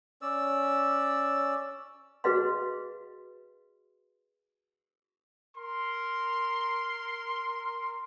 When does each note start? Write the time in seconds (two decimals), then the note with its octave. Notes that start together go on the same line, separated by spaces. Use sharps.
0.22 C#4 D5 E6
2.24 F#4 G#4 B4 D#5 F5 C6
5.56 A#4 C6